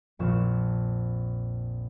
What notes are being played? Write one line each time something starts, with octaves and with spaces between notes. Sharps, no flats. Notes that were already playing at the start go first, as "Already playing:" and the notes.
A#1 F2 A#2 C#6 E7